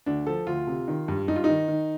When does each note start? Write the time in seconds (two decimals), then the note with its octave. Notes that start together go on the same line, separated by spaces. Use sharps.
0.06 D2 D4
0.27 F3 A4
0.47 D2 F4
0.67 C3
0.88 D#3
1.08 G2
1.28 G2 D#4
1.36 F4
1.44 D#3 D#4
1.68 D#3